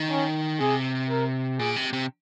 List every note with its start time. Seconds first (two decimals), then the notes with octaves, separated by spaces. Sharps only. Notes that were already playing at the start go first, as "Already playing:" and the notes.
Already playing: D#3
0.10 C#4
0.60 C3 G#4
1.10 A#4
1.59 A#2 G#4
1.76 C3
1.93 C3